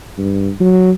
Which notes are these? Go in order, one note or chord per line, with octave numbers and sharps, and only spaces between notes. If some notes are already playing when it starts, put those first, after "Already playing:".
G2
F#3